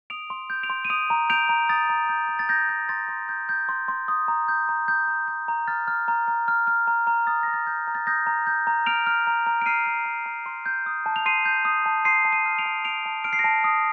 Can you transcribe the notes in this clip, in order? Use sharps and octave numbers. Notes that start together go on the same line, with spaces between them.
D#6 D7 F7
C6
G6
D7 F7
C6
D#7
D#6 D7 F7
A#5
G6 D7 F7
A#5
D#6 A6
A#5
G6
A#5
A6
G6 A#6
G6
C6 A6
C6
G6
G6
C6
C6
D#6
A#5
G6
A#5
D#6 G6
A#5
G6
A#5
F6 A6
F6
A#5
A#5
F6
F6
A#5
A#5
D#6 A6
A#5 A#6
A6
G6
A#5
A6
D#6 G6 A#6
A#5
G6
A#5
F6 D7 F7
F6
A#5
A#5
D7
F6 C7 D#7
F6
A#5
A#5
C6
G6
D#6
A5
F7
C6 C7 D#7
G6
D#6
A5
C6 C7 D#7
A5
C7 D#7
F6
D7 F7
A5
C6 D7 F7
A5
F6 D7
C7
A#6 D7
A5
D#6